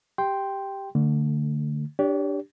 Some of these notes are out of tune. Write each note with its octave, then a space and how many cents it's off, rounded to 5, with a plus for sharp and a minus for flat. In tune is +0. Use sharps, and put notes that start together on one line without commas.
G4 +0 G5 +0 C6 +0
D3 +0 A3 +25
D4 +0 G4 +0 C#5 +40